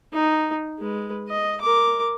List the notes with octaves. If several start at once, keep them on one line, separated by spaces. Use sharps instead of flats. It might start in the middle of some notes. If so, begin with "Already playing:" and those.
D#4
G#3 B4
D#5
A#4 D6